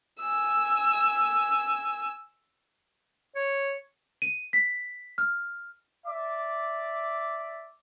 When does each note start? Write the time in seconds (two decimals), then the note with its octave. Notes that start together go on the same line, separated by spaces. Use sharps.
0.20 G#5 E6
3.35 C#5
4.22 D#7
4.53 B6
5.18 F6
6.07 D5 E5 D6